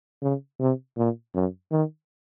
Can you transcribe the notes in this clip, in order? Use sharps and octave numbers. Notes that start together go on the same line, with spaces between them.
C#3
C3
A#2
F#2
D#3